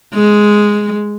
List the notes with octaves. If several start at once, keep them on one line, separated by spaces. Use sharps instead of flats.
G#3